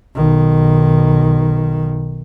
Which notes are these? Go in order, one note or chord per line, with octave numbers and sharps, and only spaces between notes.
B1 D#3